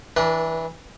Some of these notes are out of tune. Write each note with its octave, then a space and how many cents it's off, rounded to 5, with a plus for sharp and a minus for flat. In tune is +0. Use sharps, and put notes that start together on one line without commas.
E3 -20 D4 -5 B4 -45